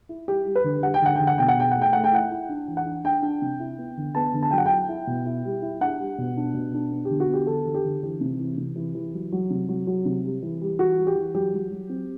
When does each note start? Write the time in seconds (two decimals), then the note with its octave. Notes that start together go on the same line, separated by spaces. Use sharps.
0.09 E4
0.28 G3 G4
0.46 G3
0.55 B4
0.64 D3
0.83 G3 F#5
0.94 G5
1.02 D3 F#5
1.16 D3 G5
1.27 F#5
1.38 B2 G5
1.48 F#5
1.57 B2 G5
1.71 A3 F#5
1.81 G5
1.93 A3 F#5
2.04 G5
2.12 E4 F#5
2.31 E4
2.49 D4
2.68 E3
2.77 F#5
2.86 D4
3.04 D4 G5
3.22 D4
3.42 C3
3.60 E4
3.78 B3
3.97 D3
4.15 B3 A5
4.33 D3
4.43 A5
4.51 F#3 G5
4.58 F#5
4.66 G5
4.71 E4
4.89 E4
5.07 B2
5.26 E4
5.45 G3
5.62 E4
5.81 D4 F#5
5.99 G3
6.18 B2
6.37 D4
6.54 B2
6.74 D4
6.92 B3
7.05 G4
7.10 D3
7.20 F#4
7.29 B3 G4
7.47 D3 A4
7.66 D3
7.75 G4
7.85 D3
8.03 E3 G4
8.21 C3
8.39 E3
8.58 C3
8.76 E3
8.95 E3
9.14 F#3
9.32 F#3
9.50 C3
9.69 F#3
9.87 F#3
10.05 C3
10.25 G3
10.43 E3
10.62 G3
10.79 E3 F#4
10.98 G3
11.07 G4
11.16 E3
11.35 F#3 G4
11.54 F#3
11.71 F#3
11.89 C4